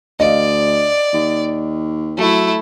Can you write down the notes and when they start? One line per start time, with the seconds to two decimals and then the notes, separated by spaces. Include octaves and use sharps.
0.20 D2 D5 D#5 F5
1.14 D#2
2.18 F#3 A3 E4